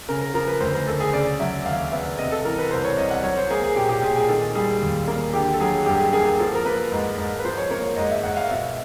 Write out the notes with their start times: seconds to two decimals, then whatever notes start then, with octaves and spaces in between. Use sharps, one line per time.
0.09 C#3 A#4
0.21 A#4
0.34 F3 A#4
0.48 B4
0.60 D2 C5
0.74 A#4
0.86 D2 A4
1.00 G#4
1.13 C#3 D5
1.40 F#3 E5
1.65 D#2 F5
1.92 B3 E5
2.18 C3 D#5
2.31 A4
2.45 E3 A#4
2.58 B4
2.71 C2 C5
2.84 C#5
2.97 C2 D#5
3.10 F#5
3.23 F#3 C#5
3.37 C5
3.50 A#3 G#4
3.63 G#4
3.76 A#2 G4
3.89 G4
4.02 A#2 G#4
4.16 G#4
4.28 D#3 A4
4.55 G3 G#4
4.82 D#2
5.08 A#3
5.33 D3 G4
5.53 A4
5.60 F#3 G#4
5.86 G2 G4
5.99 G#4
6.13 A#3 G#4
6.26 G#4
6.39 F3 A4
6.55 A#4
6.65 A#3 B4
6.92 G#2
7.18 G#2
7.39 B4
7.45 F3 C5
7.58 C#5
7.71 A#3 C#5
7.96 G#2 D#5
8.10 E5
8.23 G#2 F#5
8.37 F5
8.50 B2 E5